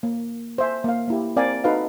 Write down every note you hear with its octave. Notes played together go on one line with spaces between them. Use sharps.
A#3
C5 E5 G#5
A#3 F5
A#3 E4 G4
C4 A#4 D5 F5 G5 G#5
D#4 F#4 A4 B4 F5